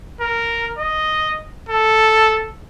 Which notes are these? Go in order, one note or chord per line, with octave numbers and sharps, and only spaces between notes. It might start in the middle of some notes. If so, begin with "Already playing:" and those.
A#4
D#5
A4